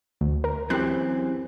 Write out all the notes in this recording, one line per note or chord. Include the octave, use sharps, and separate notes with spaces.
D2
A#4
F#2 E3 C4 G4 F#6